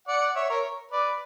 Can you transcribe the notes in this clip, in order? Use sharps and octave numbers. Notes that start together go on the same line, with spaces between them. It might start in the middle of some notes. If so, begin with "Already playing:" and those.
D5 F#5
C#5 E5
A#4 C#5
B4 D5